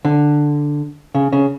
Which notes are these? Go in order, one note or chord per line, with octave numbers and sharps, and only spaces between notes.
D3
C#3
C#3